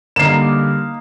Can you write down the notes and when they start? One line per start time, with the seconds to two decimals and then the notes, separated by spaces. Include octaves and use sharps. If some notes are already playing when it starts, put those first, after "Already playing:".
0.16 D3 G3 A#3 D#4 F5 C7 E7